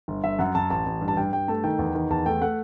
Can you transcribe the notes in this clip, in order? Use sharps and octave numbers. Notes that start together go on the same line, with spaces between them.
G1
G1 E5
F#2 F#5
F#2 A5
A1 A5
A1
G2
A5
G2 G5
G2 G5
A3 A5
D#3 G5
E2
D#3
E2 A5
A3 G5
A3 F#5